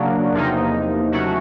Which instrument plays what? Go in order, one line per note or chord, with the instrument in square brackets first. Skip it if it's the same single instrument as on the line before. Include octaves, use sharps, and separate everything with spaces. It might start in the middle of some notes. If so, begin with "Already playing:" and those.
Already playing: [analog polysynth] C#3 F#3 A#3 D4
E2 C3 F3 A#3 D#4
C#3 F#3 A3 C#4 F#4